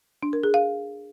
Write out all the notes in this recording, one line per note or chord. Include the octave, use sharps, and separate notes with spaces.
D4
A#4
G#4
F5